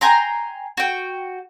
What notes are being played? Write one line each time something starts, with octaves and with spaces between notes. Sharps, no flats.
G5 G#5 A#5 C6
F#4 G5